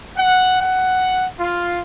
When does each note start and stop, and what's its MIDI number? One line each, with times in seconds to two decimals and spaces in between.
0.16 0.58 78
0.60 1.26 78
1.39 1.79 65